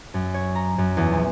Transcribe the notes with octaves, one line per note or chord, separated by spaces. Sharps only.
F#2
C#5
A#5
F#2
E2
A#1